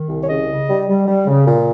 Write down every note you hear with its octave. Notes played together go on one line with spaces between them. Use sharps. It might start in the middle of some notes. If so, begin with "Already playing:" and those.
Already playing: D#3
C2
C#5
C#3 D#5
C#3
G3
G3
G3
C#3
A#2